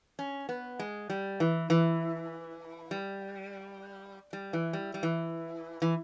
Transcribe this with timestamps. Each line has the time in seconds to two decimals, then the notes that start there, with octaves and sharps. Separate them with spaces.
0.19 C#4
0.49 B3
0.79 G#3
1.10 G3
1.40 E3
1.70 E3
2.91 G3
4.33 G3
4.53 E3
4.73 G3
4.94 G3
5.03 E3
5.82 E3